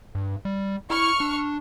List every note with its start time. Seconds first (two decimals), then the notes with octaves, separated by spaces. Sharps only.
0.15 G2
0.45 G3
0.90 E4 C#6 F6
1.20 D4